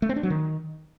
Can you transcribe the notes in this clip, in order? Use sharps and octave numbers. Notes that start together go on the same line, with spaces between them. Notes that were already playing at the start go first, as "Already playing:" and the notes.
A3
C4
D4
F#3
D#3